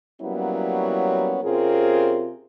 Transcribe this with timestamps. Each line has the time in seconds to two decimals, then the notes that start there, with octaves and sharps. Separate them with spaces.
0.22 F#3 G3 A#3 B3 C#4 E4
1.44 C3 C4 C#4 F4 G#4 A#4